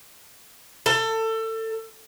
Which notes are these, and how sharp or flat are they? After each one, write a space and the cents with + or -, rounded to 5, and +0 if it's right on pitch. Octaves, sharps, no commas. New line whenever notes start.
A4 +25